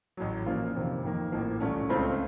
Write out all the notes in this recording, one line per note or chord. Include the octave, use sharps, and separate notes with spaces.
A1 A2 F#3
A#2 F3 A#3 C#4 F4
F2 C3 D#3 A#3
F2 D#3 A#3
A1 A2 F3 A#3
C2 A#2 A3 C#4
C#2 C#3 A3 C4 F4